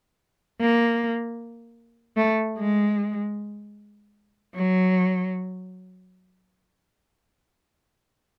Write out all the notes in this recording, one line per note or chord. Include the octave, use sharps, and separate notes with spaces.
A#3
A3
G#3
F#3